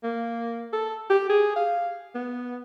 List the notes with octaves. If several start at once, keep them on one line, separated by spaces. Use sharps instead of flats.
A#3
A4
G4
G#4
F5
B3